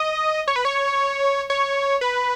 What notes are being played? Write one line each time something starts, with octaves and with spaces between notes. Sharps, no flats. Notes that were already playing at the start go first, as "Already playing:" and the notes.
Already playing: D#5
C#5
B4
C#5
C#5
B4